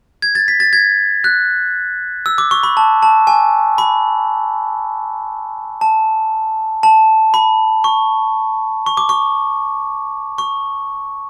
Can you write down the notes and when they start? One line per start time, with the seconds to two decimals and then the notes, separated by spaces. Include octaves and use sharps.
0.22 G#6
0.35 A6
0.48 B6
0.60 A6
0.73 G#6
1.24 F#6
2.26 E6
2.38 D6
2.51 C#6
2.63 B5
2.77 A5
3.03 A5
3.27 G#5
3.78 B5
5.81 A5
6.83 A5
7.34 B5
7.84 C#6
8.86 C#6
8.97 D6
9.09 C#6
10.38 C#6